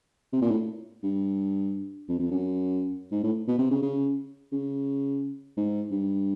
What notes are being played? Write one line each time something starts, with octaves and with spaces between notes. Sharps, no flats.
C3
A#2
A2
G2
F2
F2
F#2
G#2
A2
B2
C3
C#3
C#3
C#3
G#2
G2